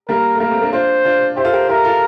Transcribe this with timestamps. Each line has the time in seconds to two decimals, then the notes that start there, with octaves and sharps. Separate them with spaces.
0.08 G3 A#3 A#4
0.35 A3
0.40 G3 A#3 A#4
0.51 A3 C4
0.62 A#3 D4
0.72 D4 F4 C5
1.05 D4 F4
1.36 E4 G4 C5
1.44 F4 A4
1.53 G4 A#4
1.68 E4 G4 A#4
1.85 F4 A4